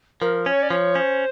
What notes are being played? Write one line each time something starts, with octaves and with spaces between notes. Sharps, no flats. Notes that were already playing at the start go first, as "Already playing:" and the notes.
F3 A#4
C#4 C#5
D5
F3 C#5
C#4 C5